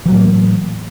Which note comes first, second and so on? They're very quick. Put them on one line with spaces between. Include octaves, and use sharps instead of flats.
E3 F#3 A2 A#3